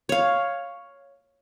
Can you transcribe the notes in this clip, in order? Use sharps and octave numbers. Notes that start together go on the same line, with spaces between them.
C#5 F5